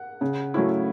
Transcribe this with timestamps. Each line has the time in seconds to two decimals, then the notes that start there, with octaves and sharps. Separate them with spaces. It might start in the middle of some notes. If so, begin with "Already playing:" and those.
Already playing: F#5
0.21 C#3
0.54 F#3 A3 C#4 E4